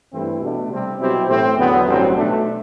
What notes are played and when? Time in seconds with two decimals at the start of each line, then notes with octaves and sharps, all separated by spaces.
0.11 G2 E3 A3 C4 E4
0.40 B2 A3 D4
0.69 C3 G3 C4
0.99 B2 F#3 C4 E4 G4
1.27 A2 E3 A3 C4
1.56 E2 D3 F#3 B3
1.86 A1 G2 F#3 C4
2.15 B1 B2 A3 D4